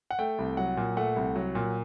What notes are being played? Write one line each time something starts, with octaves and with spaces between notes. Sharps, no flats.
F#5
A3 G5
C2
F#3 F#5
A#2
A3 F#5
C2
F#3
A#2